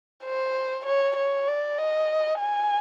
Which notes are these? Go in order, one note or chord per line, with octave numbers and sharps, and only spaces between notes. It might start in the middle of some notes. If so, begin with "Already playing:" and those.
C5
C#5
C#5
D5
D#5
G#5